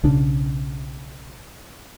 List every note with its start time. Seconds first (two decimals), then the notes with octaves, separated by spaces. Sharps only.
0.03 B1 C#3 D4